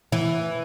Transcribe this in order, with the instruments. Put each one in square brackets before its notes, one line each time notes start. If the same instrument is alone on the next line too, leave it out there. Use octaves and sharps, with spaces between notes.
[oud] E3